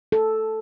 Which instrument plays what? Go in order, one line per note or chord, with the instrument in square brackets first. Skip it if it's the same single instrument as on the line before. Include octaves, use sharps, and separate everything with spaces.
[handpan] A4